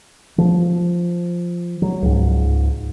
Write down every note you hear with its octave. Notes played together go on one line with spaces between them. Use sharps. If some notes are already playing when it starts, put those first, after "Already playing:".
F3
F#3
C#2 G#2